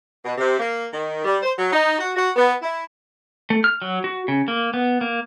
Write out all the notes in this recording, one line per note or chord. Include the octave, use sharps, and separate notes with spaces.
B2
C3
A#3
D#3
G3
C5
F#3
D#4
F#4
F#4
B3
E4
A3
F6
F#3
F#4
C#3
A#3
B3
A#3